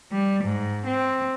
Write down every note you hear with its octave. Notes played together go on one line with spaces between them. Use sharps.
G3
G#2
C4